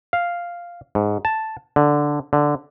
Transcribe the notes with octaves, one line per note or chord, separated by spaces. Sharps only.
F5
G#2
A5
D3
D3